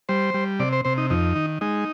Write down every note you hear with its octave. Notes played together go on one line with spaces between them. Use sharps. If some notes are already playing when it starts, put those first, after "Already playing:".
G3 C5
G3
C3 D5
C5
C3 C5
D#4
F2 D#4
D#3
G#3 D#4